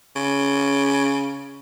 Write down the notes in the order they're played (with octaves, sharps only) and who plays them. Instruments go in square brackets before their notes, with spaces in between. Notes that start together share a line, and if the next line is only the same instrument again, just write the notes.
[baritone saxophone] C#3